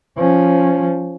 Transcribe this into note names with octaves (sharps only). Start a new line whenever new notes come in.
F3 C#4